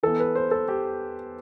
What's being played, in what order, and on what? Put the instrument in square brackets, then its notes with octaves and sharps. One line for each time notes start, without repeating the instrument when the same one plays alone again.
[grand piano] E3 B3 A4
B4
C5
A4
G4